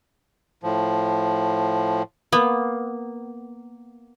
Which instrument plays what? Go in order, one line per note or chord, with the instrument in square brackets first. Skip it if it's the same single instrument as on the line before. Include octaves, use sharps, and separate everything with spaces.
[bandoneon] A2 F3
[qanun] A#3 [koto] B3